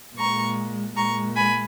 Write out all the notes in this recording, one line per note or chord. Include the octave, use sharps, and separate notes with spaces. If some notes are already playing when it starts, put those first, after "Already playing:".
A#2 G#3 A#5 C#6
A#2 G#3 A#5 C#6
G#5 B5